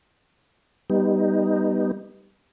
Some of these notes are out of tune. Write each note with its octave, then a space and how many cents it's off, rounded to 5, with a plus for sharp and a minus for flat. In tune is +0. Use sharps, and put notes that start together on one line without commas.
G3 +0 B3 -5 D#4 +0